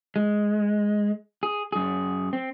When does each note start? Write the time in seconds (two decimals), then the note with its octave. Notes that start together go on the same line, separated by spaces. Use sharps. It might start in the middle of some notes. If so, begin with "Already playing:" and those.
0.16 G#3
1.43 G#4
1.72 F#2 G#4
2.33 C4